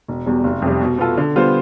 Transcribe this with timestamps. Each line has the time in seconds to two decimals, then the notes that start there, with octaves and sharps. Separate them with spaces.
0.08 E1
0.26 E2 B2 G3
0.44 F1
0.62 F2 C3 G3
0.81 B2
0.98 B3 F4 A4
1.18 D3
1.36 G3 B3 F4 C5